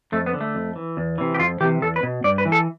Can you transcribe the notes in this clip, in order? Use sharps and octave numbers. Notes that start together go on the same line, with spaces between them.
F2 A3
B3
D3
A3
F2
E3
E2
C3 E3
G4
F2 F4
C3 E3 G4
E2 A4
B4
B2
G2 D5
B4
E3
A4